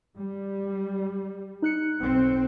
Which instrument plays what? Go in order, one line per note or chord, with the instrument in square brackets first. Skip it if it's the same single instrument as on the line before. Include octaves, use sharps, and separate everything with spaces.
[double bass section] G3
[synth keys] D#4 F#6 C#7
[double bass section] B1 C4